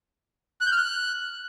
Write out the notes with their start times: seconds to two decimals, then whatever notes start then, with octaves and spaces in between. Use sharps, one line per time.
0.61 F#6
0.66 G6
0.72 F6
0.77 F#6